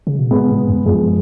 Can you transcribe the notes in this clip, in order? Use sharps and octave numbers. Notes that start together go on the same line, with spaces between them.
C#3
B2
A2 G#3 B3
A2
F#2
F#2 F3 G#3